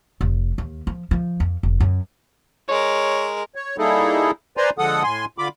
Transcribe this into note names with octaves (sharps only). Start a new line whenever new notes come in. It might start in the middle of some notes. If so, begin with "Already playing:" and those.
F1
D#2
F3
F3
F2
F1
F#2
G#3 A#4 C#5
C#5
G3 A#3 D#4 E4 G#4 A4
B4 C5 D5 G#5 A#5 C6
D3 F3 G#3 A4 F#5 D#6
A2 G#5 C6
D3 F4 B5 D6